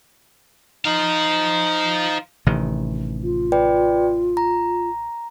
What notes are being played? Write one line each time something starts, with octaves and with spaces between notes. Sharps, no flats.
D#4 C5 F5
A1 C3 D#3
F4
B4 D5 G5
A#5